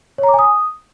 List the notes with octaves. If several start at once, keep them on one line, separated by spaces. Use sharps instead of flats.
C#5
A#5
D6
G#5
D#6